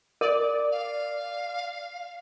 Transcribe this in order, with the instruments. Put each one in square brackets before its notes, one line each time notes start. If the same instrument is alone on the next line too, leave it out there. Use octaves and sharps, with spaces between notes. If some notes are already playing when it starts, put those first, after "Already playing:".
[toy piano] A#4 [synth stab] D5
[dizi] F5